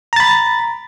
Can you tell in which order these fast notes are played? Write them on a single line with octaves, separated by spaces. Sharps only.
A#5 A6 B5